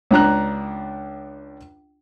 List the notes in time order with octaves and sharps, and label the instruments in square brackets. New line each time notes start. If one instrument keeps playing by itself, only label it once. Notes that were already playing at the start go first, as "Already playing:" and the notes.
[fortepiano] C#2 D4 A#5 F#6